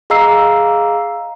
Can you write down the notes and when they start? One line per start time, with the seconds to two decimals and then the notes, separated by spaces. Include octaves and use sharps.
0.10 G#4 D#5 F5 A#5 E6 C7